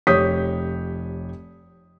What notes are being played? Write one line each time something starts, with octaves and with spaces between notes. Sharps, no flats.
F1 G4 C#5 D#6 G6 B6